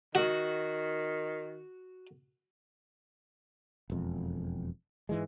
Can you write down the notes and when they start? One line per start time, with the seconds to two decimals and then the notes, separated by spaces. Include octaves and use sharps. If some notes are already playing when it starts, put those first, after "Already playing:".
0.15 D#3 F#4
3.90 E1 F2
5.09 G#2 E3 G#3